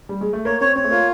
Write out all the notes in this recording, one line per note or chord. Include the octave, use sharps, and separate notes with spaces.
G3
G#3
A3
A#3 C#5
C4 C#5
C4 C#5
A3
A#3 F4